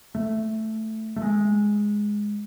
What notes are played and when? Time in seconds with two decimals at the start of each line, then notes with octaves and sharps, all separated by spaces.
0.15 A3
1.16 A3
1.22 G#3